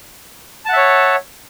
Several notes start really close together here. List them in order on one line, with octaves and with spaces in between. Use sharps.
A5 F#5 E5 C#5